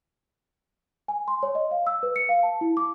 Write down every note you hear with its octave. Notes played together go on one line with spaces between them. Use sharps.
G#5
C6
C#5
D#5
F5
E6
B4
C#7
F5
A5
E4
D6